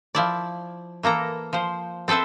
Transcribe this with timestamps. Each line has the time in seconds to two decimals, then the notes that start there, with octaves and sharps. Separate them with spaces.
0.15 F3 E4 D5
1.03 E3 A#3 A4 A#5
1.53 F3 C5
2.08 C4 A4 B4 C5 E5